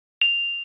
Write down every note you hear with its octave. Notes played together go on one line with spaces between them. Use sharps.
F7